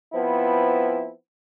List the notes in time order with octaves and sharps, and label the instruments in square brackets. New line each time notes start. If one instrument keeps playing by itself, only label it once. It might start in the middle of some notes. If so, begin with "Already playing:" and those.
[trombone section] F3 B3 C4 E4